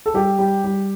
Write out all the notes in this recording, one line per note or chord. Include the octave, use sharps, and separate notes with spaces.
A4
G3 G4
G3
G3